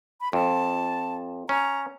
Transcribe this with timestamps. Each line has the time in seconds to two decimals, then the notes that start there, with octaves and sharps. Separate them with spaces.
0.21 B5
0.33 F2 A5
1.49 C#4 A#5